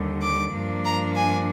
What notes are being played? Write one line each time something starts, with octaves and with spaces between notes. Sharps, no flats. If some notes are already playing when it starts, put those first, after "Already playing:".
Already playing: D#2 D3 G3
D6
G2 F3 A#3 D4
A#5
G#5